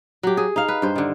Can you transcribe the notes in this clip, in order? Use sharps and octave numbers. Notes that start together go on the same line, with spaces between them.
F#3 G4
G#4
D#4 F5
B4
G2 C5
D3 D#3